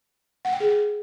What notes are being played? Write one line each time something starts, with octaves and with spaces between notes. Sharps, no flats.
F#5
G5
G#4